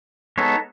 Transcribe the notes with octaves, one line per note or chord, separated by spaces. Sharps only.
G#3 B3 D#4 A4 C#5